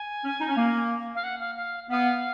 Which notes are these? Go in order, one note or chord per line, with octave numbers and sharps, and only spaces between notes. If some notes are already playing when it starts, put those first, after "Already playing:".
Already playing: G#5
C#4
D#4
C#4
A#3
F5
F#5
F5
F5
B3 F5